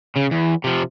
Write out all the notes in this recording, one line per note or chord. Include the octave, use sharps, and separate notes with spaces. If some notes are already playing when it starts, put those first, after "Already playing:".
C#3
E2
C3 F3